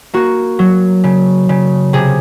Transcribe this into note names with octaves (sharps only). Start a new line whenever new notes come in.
A#3 F#4
F#3
C#3
C#3
C3 G#4